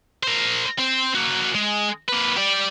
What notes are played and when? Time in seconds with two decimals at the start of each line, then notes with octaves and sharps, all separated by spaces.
0.23 A#4 C5
0.79 C4 C5
1.15 A#3 F#4
1.55 G#3
2.08 A#3 B4
2.37 G4 D5